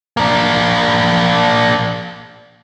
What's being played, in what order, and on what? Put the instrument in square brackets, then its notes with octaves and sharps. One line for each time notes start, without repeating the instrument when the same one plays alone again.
[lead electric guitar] A#3 D4